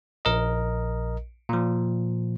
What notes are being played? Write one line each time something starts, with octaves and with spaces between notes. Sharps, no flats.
A#1 A#4 D#5
A#2 F3